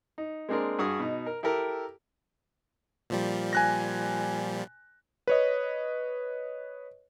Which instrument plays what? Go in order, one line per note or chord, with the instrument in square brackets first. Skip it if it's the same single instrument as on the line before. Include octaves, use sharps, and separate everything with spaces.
[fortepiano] D#4
G#3 A#3 C4 D4 G#4 A#4
G2 F#4 G#4 C#6 D#6
B2 D#4
A#4
E4 G4 A4 A#4
[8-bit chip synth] A#2 F3 G3
[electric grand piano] G#5 F#6 A#6
B4 C#5 D#5